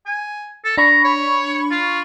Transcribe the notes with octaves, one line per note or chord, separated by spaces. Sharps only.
G#5
A4
D4 A#5 B5 C#6
C#5
F4